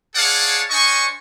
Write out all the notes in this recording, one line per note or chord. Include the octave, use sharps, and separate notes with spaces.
G#4 C#5 D5 F5 F#5 A5
D4 C5 D#5 G#5 C#6